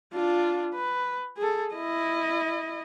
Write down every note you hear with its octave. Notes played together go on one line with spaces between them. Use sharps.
D4 F4
B4
G#4 A4
E4 D#5